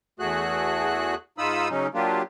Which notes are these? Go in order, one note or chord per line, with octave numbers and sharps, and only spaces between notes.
E2 A3 F#4 G#4 F#6
G#2 D#4 F4 B5 D#6 E6
C#3 F#3 C#4 D#4
F#3 A#3 D4 F4 G4